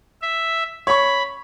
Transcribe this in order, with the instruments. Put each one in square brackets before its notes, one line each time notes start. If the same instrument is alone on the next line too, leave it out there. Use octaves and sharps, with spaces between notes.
[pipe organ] E5
[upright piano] C#5 C#6 [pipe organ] B5